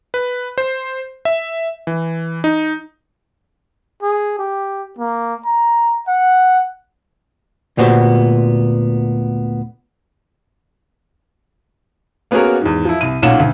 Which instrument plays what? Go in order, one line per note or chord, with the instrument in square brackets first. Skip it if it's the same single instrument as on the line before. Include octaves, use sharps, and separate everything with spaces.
[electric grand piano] B4
C5
E5
E3
D#4
[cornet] G#4
G4
A#3
A#5
F#5
[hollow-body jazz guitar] D2 A#2 B3 F#4 G4 C5
[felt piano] A#3 B3 C#4 F#4 G#4 A#4
E2 G#2
F3 E4
C2 D#7
B1 A#2 A#3 C#4 F#5 E7
D2